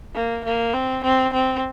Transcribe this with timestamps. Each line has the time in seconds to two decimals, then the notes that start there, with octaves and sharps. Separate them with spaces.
0.15 A#3
0.45 A#3
0.74 C4
1.04 C4
1.33 C4